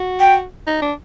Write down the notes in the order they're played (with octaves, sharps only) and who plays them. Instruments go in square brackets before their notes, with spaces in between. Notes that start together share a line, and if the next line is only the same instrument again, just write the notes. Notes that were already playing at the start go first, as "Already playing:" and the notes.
Already playing: [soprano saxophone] F#4
[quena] G5
[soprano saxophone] D#4
D4